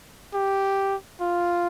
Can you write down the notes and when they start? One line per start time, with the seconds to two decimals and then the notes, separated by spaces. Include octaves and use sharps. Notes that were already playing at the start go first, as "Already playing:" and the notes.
0.34 G4
1.21 F4